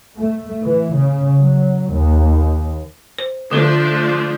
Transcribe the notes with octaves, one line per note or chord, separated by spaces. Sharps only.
A3
E3
C#3
F#3
D#2
C5
D3 F3 A3 D4 A4